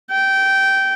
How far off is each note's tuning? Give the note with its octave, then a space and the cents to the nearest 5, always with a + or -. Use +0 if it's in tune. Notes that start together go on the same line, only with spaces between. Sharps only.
G5 -15